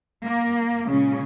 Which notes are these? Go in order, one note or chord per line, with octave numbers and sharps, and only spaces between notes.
A#3
A#2 C#3 G#3 C#4